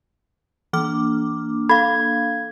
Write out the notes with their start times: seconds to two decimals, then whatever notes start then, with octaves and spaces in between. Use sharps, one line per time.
0.73 E3 A#3 D4 D6 F6
1.69 A4 F5 B5 G#6